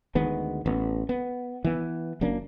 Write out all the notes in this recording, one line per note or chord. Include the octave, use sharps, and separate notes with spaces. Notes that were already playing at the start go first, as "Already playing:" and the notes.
D2 D#3 G#3 B3
A1 B3
B3
E3 B3
F#1 F#2 A#3 D4